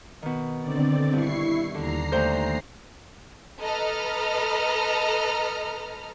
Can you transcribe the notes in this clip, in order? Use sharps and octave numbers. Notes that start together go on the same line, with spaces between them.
B2 D#3
D3 C4 D5
G2 E4 C#6 C7
D#2 D3 A#5 C7
D2 C5 G6
A4 B4 D#5 A#5 F6